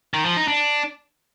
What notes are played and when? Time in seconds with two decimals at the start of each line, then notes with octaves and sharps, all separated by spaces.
0.14 D#3
0.25 F3
0.37 D#4
0.48 D4